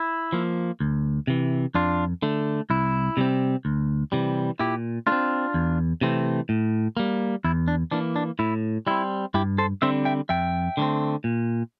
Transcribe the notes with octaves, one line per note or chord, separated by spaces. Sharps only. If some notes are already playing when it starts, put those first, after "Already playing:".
Already playing: E4
F3 A#3
D2
C3 E3
F2 D4 F4
D3 A3
C2 E4
C3 G3 C4
D2
C3 E3 G3
A#2 E4 G4
A3 D4 F4
C4
E2
C3 E3 A3 C4
A2
G3 A#3
E2 E4
D4
E3 A#3 D4
D4
A2 E4
G3 C4 E4
G2 E4 G4
A4 C5
D3 G3 C4 C5 E5
E5 G5
F2 E5 G5
D3 A3 C4
A#2